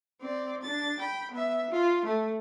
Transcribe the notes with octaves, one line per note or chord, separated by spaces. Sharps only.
C4 D5
D4 A6
G5 B5
B3 E5
F4
A3